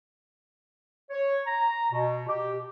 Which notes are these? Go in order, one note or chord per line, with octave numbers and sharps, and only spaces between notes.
C#5
A#5
B2
G4